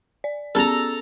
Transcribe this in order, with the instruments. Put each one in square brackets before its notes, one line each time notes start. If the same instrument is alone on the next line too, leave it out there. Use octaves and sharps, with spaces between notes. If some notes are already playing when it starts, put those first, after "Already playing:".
[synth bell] D5
[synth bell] B3 C#4 G#4 [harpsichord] A4 A#5